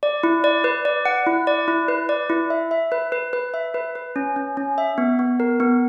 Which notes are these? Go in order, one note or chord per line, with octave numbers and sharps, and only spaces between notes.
D5
E4
D5
B4
D5
F#5
E4
D5
E4
B4
D5
E4
E5
E5
B4
B4
B4
E5
B4
B4
C#4
C#4
C#4
E5
B3
B3
A#4
B3